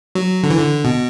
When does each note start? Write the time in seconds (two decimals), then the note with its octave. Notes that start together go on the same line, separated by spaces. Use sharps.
0.15 F#3
0.43 D3
0.50 E3
0.57 D3
0.85 B2